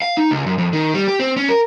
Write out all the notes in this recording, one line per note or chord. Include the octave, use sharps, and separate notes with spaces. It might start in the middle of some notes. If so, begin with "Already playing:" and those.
F5
D#4
C#2
F#2
F2
D#3
G3
G4
C4
C#4
A#4